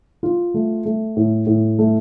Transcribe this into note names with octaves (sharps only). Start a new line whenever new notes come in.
F4
A3
A3
A2
A2
A3